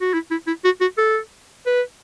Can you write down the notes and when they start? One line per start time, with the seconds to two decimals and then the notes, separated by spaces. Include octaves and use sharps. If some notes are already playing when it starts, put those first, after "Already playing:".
0.01 F#4
0.14 E4
0.31 E4
0.47 E4
0.65 F#4
0.81 F#4
0.98 A4
1.66 B4